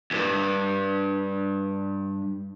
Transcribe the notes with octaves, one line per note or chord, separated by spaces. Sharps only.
D2 G2